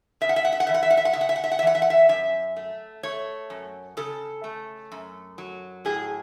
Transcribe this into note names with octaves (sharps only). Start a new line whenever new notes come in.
C#3 E5
F#5
E5
F#5
E5
F#5
E3 E5
F#5
E5
F#5
E5
F#5
C#3 E5
F#5
E5
F#5
E5
F#5
E5
E3 F#5
E5
F#5
E5
F#2 E5
A3
A3 C#5
F#2
C#3 A4
A3
F#2
F#3
A2 G#4